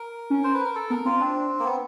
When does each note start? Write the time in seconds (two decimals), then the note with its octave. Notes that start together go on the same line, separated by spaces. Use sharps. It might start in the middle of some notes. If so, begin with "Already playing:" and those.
Already playing: A#4
0.30 C#4
0.44 C5
0.54 B4
0.65 A#4
0.75 A4
0.90 B3 A#4
1.05 C4 F4
1.20 C4 D4
1.59 A#3
1.65 B3